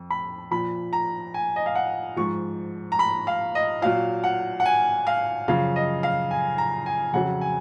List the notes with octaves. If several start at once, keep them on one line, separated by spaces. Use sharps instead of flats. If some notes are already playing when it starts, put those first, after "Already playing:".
Already playing: F2
B5
A#2 F3 B5
A#5
G#5
D#5
F5
F#5
G#2 F3 C#6
A#5
B5
F5
D#5
A#2 F#3 F5
F#5
F#5
G#5
F5
F#2 C#3 F3 F5
D#5
F5
G#5
A#5
G#5
F2 C#3 F#3 F#5
G#5